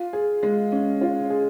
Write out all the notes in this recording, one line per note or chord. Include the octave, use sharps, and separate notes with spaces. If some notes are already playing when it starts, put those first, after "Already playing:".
Already playing: F4
G#4
G#3
C#4
F4
G#4